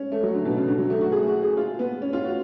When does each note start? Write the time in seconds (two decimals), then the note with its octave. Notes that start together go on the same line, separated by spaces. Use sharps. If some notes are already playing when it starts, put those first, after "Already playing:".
Already playing: C#4
0.12 A3
0.23 F#3
0.34 D3
0.45 B2
0.57 C#3
0.68 D3
0.78 F#3
0.90 A3
1.01 F#4
1.12 G#4
1.28 F#4
1.43 G#4
1.57 F4
1.79 B3
2.02 C#4
2.13 F4
2.24 F#4